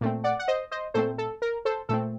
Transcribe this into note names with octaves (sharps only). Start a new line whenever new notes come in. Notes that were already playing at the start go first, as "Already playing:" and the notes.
A#2 A3 C4
D5 F#5
F#5
C5 D#5
C5 D#5
A#2 A3 C4 A4 C5
A4
A#4
A4 C5
A#2 A3 C4 A4